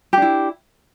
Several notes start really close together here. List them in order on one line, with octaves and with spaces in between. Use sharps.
G4 D4 E4